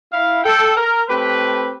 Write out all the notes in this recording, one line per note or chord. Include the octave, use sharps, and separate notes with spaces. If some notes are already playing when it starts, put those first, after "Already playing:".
E4 F5
A4 G5
A#4
A3 C4 G4 B4